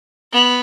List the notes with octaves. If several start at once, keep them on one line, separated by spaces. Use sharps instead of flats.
B3